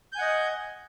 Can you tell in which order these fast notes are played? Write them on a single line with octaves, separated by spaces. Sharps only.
G6 G#5 F#5 D#5